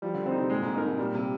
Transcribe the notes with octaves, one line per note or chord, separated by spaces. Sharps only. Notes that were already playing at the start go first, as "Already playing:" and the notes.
F3 G3
D3
D3 C4
D#4
C3
A#2 G#3
G#2
G2 D#4 A#4
G#2
A#2 G3
C3